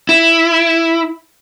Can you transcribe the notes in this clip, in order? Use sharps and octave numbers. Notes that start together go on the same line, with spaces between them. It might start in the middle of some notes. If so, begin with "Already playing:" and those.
E4